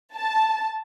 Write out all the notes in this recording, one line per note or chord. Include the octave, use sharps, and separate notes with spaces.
A5